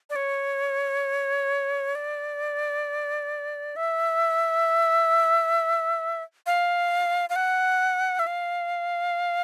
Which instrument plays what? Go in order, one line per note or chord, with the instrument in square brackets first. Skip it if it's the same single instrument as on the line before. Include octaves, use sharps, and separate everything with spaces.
[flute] D5
C#5
D5
E5
F5
F5
F#5
E5
F5